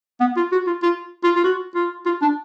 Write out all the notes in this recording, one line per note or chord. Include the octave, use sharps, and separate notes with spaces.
B3
F4
F#4
F4
F4
F4
F4
F#4
F4
F4
D4